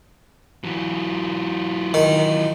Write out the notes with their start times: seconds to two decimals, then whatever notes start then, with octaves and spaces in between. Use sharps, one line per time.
0.64 E3 F#3
1.94 D#3